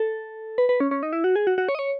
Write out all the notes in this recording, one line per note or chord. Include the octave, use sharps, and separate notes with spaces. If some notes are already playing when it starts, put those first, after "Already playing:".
Already playing: A4
B4
B4
C#4
C#4
D#4
E4
F#4
G#4
F#4
F#4
C#5
D#5
C#5